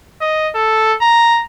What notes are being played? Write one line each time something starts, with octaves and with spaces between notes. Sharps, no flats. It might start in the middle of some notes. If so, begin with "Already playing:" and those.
D#5
A4
A#5